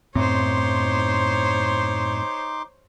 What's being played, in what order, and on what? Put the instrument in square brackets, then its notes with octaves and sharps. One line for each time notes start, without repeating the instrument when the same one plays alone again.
[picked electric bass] F#2 A2 C4 [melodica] D#4 C6 D6 [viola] C5 C#5